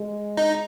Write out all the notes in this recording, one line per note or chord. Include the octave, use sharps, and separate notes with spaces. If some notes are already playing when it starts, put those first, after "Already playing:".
Already playing: G#3
D#4